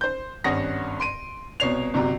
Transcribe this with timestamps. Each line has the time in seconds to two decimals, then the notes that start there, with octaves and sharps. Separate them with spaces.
0.01 C5 G6
0.44 G#1 G2 C#4 F#5 D#6 A#6
1.00 C6 D7 D#7
1.60 C2 B2 C#5 C7 F7
1.94 G1 C3 F#3 A#5